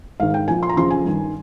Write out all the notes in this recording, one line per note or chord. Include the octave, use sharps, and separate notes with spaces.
G#2 D#3 F5
G5
A#2 F3 G#5
C6
A#5
F2 C#3 F3 C6
G#5
G2 D#3